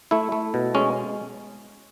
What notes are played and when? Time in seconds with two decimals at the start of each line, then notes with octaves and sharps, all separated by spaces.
0.11 A3 E4
0.32 A3
0.54 B2
0.75 G#3 C#4